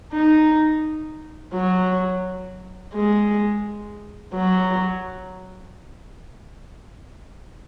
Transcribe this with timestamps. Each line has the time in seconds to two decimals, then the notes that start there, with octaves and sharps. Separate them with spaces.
0.12 D#4
1.54 F#3
2.93 G#3
4.34 F#3